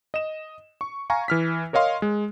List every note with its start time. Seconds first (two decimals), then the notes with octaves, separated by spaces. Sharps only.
0.14 D#5 E7
0.81 C#6
1.10 F5 G#5 A#5 C#6
1.28 E3 F6 B6
1.73 A#4 C#5 D#5 F5 C6
2.02 G#3